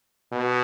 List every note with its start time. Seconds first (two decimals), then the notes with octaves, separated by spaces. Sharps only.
0.33 B2